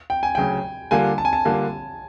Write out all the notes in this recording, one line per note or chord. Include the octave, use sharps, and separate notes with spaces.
G5
G#5
D2 C#3 F#3 G5
D3 G3 A#3 D4 F4 G#5
A5
G#5
A5
D3 G3 A#3 D4 F4